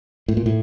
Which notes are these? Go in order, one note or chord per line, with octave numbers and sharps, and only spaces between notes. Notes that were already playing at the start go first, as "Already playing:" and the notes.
A2
A#2
A2